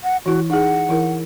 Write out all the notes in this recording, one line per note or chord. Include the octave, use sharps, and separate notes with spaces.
F#5
E3 E4 F#4
D#4 G#4 F#5
E3 E4 A#4